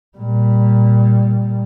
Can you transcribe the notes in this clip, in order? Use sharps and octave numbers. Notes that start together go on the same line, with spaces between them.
A#2 G3